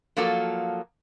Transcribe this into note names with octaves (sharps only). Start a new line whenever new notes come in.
F3 F#3 A#3 F4 A4